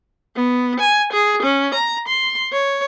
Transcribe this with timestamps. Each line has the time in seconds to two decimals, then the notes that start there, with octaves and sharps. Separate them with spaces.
0.36 B3
0.80 G#5
1.13 G#4
1.42 C#4
1.74 A#5
2.08 C6
2.52 C#5